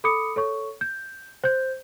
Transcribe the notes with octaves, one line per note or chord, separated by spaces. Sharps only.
A4 B5 D6 D#6 C#7
A4 C#5 C#6
G6
C5 G6